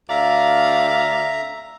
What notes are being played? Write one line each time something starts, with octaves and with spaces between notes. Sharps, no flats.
D2 D5 E5 F5 A#5